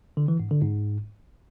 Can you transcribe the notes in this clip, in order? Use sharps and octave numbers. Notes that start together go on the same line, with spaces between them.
D3
E3
G#2
D3
G#2